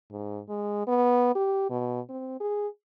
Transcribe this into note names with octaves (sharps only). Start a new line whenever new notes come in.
G#2
G#3
B3
G4
B2
C4
G#4